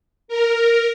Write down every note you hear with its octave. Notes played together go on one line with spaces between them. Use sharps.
A#4